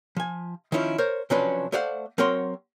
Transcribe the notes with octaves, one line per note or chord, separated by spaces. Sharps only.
F3 G#5
D#3 F3 C#4 E4 F4
A#4 C5 C#5
C3 F3 F#3 C#4 D4 B4
A3 A4 C5 D5 F5 F#5
F#3 C4 A#4 C#5 F#5 C6